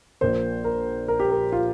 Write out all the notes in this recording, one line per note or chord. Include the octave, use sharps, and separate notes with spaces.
A#1 A#2 A#3 C5
A#4
A#4
G4
A#4
F4